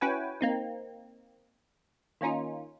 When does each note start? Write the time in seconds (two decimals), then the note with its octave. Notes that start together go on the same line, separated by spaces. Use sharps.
0.01 C#4 E4 F#4 B4 G5 G#5
0.41 A#3 C4 D#4
2.21 D#3 A#3 C#4 D#4 F4